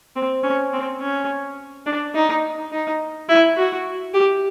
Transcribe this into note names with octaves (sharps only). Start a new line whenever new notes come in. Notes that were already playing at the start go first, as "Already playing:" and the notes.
C4
C#4
C4
C#4
D4
D#4
D#4
E4
F#4
G4